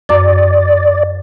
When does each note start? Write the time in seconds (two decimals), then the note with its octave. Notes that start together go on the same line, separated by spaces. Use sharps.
0.09 F#2 D5 D6 A6